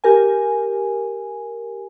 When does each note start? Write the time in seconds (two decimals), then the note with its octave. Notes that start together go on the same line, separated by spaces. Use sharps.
0.04 G4 A#4 G#5